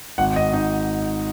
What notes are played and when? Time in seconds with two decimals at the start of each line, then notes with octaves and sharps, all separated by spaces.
0.18 G#1 F#5
0.36 D#5
0.53 D#4 D#5